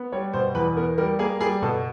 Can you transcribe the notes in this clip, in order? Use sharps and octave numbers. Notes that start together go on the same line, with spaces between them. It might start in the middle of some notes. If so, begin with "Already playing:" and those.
Already playing: B3
G3 C#5
B2 C5
E2 B4
B3 A#4
G3 A#4
A#3 G#4
G3 G#4
B2 A4